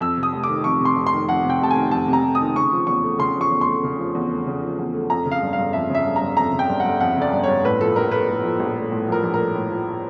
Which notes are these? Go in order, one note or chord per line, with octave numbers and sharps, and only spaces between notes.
F2 E6
C3
D#6
F1
D6
D#3
F2 C#6
C3
C6
F1
C6
D#3
F2 F#5
C3
G5
F1 A5
G#5
D#3
F2 A5
C3
A#5
F1
D#6
D#3
C#3 C#6
F3
E2 C#6
A3
C#3 C6
F3
C#6
E2
C6
A3
C#3
F3
E2
A3
C#3
F3
E2
A3
F2 A#5
C#3
F5
G1
G1 F5
F2 E5
C#3 E5
G1
A#5
G1
F2 A#5
C#3
G5
G1
G1 F#5
F2 F#5
C#3 D5
G1
G1 C#5
A2 B4
F3 A4
A#1 A#4
A3 B4
A2
F3
A#1
A3
A2
F3 A#4
A#1
A3 A#4
A2
F3